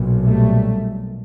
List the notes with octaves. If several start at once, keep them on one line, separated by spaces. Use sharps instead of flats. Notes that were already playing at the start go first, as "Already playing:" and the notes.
Already playing: B1 A#2
G3 A3